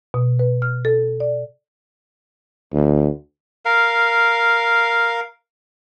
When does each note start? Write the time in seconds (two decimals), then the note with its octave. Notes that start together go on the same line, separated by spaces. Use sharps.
0.14 B2
0.39 B4
0.62 F6
0.85 A4
1.20 D5
2.74 D2
3.65 A#4 F5